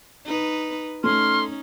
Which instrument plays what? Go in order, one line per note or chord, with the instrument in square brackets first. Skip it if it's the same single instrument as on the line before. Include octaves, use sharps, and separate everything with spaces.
[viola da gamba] D#4 B4
[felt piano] A3 [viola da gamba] C#4 D#4 [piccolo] C6 [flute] F6